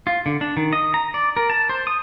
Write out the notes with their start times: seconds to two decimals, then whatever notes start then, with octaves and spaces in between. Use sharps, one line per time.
0.07 F4
0.26 D3
0.41 D4
0.57 D#3
0.73 D#5
0.94 A#5
1.14 D5
1.37 A#4
1.50 A5
1.69 C5
1.87 D#6